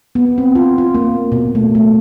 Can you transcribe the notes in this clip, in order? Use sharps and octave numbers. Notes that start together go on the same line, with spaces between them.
B3
C4
F4
F4
A#3
B2
A3
A3